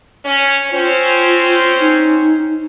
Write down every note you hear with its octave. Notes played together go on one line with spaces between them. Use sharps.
C#4
C4 C#4 F4 C5
D#4